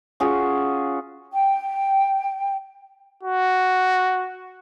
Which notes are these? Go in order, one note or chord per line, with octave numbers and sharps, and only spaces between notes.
C#4 F4 F#4 G#4
G5
F#4